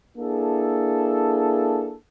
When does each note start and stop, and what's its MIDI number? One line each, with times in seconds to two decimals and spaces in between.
0.17 1.94 58
0.17 1.94 62
0.17 1.94 64
0.17 1.94 68
0.17 1.94 69